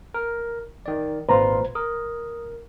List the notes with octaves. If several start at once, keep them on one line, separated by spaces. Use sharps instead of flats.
A#4
D#3 D5
G#1 A#2 F4 B4 C5 A#5
A#4 D#6